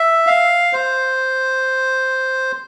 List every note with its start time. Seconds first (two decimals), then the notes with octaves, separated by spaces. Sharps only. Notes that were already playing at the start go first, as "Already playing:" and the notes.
Already playing: E5
0.27 F5
0.73 C5